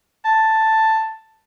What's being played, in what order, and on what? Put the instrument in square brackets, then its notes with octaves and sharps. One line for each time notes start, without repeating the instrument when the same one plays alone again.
[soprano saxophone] A5